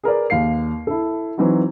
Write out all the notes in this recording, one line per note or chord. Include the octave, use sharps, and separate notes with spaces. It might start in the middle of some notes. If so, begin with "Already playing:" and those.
G#4 A#4 B4 D5
D#2 F5 C7
E4 A4
E3 F#3 C4 D#4 F#4